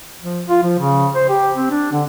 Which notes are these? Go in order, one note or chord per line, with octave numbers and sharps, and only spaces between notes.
F3
F4
F3
C#3
C5
G4
C4
D4
D3